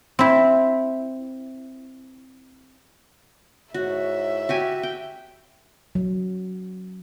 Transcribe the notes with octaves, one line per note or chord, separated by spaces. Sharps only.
C4 E4
G#2 E4 F#4 C#5 E5
F#4 G4 G#5
G5
F#3